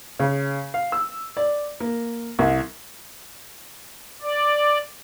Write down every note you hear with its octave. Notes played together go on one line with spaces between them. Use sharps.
C#3
F5
E6
D5
A#3
C2
D5